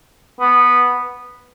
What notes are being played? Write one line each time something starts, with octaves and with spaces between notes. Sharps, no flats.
B3